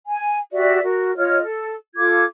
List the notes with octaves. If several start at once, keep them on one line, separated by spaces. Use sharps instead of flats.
G#5
F#4 G4 D5 E5
F#4 A#4
F4 C#5 D#5 F6
A4
F4 A4 D6 G#6